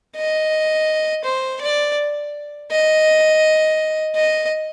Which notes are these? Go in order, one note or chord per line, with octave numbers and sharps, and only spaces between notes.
D#5
C5
D5
D#5
D#5